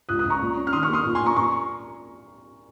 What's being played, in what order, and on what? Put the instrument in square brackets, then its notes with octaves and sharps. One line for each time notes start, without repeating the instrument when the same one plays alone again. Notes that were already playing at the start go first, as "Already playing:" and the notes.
[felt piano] C#2 D#6 F#6
D#6 F#6
C#2
A#5 C#6
A#2
C#4
F6
D#3 C6 D#6
C#6 F6
A#3
C6 D#6
A#2
G#5 C6
A#2
A#5 C#6
A#2 A#5 C#6